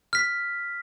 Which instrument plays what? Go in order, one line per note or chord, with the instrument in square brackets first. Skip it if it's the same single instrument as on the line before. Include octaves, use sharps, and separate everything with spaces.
[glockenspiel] F6 B6